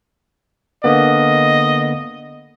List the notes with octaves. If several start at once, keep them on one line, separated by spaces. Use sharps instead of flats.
D3 A#3 B3 D#5